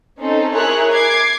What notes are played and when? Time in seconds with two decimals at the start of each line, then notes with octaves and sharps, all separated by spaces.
0.19 C4 C#4 D#4 A4
0.54 E4 G#4 A#4 C#5 F#6
0.92 D6 G#6 C7